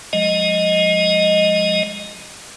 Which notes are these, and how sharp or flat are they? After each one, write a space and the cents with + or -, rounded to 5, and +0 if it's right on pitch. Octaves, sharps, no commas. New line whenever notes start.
F3 +40 G#3 +0 D#5 +0